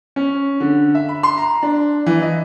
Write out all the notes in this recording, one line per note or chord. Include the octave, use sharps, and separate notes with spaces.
C#4
D3
E5
B5
C6
A#5
D4
E3
D#5